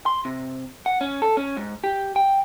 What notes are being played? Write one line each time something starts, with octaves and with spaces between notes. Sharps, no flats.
C6
C3
F#5
C#4
A4
C#4
G#2
G4
G5